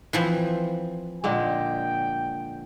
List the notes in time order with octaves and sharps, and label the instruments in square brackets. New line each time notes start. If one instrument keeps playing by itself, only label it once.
[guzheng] E3 F3 C4
[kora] A#2 D3 G#3 [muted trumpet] G5